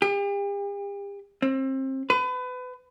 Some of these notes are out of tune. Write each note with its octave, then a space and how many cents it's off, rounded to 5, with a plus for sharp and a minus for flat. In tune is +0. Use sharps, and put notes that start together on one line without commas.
G4 +40
C4 +30
B4 +30